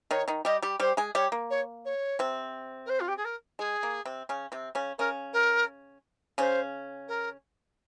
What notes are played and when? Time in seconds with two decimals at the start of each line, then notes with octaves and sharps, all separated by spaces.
0.11 D#3 D#4 C#5
0.28 D#3 D#4
0.45 G3 G4 D#5
0.62 G3 G4
0.80 G3 G4 C5
0.97 G#3 G#4
1.15 G3 G4 C#5
1.32 A#3
1.50 C#5
1.85 C#5
2.19 C3 C4
2.86 A#4
2.89 C5
3.00 F4
3.08 G4
3.17 G#4
3.25 A#4
3.59 G#3 G#4
3.83 A#3
4.05 C3 C4
4.29 C#3 C#4
4.52 C3 C4
4.75 C#3 C#4
4.98 C#3 C#4 A#4
5.33 A#4
6.38 C#3 C#4 C5
7.08 A#4